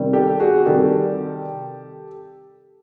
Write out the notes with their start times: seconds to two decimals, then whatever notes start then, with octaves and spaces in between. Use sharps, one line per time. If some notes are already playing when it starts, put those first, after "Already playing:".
Already playing: C3 D#3 G3
0.13 G4 A4
0.40 F#4 G#4
0.66 C3 D#3 G3 G4 A4